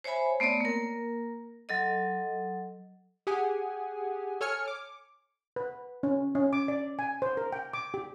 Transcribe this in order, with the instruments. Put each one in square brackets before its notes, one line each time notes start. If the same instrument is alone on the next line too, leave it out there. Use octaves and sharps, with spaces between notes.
[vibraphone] C5 C#5 E5 G#5 B5
A3 B3 C4 C#5 D5
A#3 A#4
F#3 A4 D#5
[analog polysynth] G4 G#4 F#5 G#5
A4 C#5 G#5 F6 C#7
D6
[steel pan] B4
C#4
C#4
D6
D5
G#5
C5
A#4
G5
D6
G4